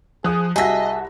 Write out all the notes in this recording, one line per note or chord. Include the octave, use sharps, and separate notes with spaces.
F3 G#4 D#6 F#6
C2 F#4 G#4 D#5 E5 A5 A#6